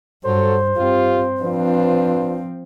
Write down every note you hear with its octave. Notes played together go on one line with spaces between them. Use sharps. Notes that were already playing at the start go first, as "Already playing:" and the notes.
G2 F#3 F#4 A4 C5
G2 C4 F4 G4
F3 C4 D4 F4 B4